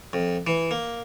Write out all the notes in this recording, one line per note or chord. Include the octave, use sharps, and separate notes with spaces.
F2
E3
A#3